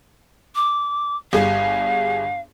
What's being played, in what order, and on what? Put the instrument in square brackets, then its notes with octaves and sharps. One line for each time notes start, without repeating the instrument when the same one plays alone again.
[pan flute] D6
[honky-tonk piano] G1 G3 G#4 [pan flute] F5